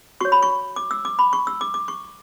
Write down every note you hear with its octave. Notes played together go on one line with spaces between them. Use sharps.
F#4 C#5 C#6
B5
C#6
D6
E6
D6
B5
C#6
E6
D6
D6
C#6